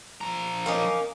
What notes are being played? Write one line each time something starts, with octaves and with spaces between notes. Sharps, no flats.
F3 A#5
A#3 C#4 D#4